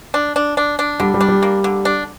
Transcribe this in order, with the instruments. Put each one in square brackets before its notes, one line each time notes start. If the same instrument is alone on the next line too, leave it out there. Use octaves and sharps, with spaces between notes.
[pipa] D4
D4
D4
D4
[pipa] D3 [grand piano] G3
[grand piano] G3
[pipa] D4
[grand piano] G3
[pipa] A#3
D3
D4